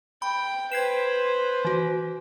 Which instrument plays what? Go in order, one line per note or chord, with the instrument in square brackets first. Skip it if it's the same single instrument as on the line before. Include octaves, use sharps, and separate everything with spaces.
[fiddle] G5 [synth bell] B5
[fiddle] B4 C5 [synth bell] G#6 C7 E7
[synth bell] E3 F#4